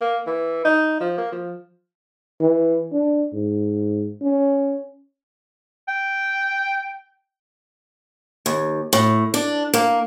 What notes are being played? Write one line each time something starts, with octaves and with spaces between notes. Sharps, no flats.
A#3
E3
D#4
F3
A#3
F3
E3
D4
G#2
C#4
G5
D#2
A2
D4
A#3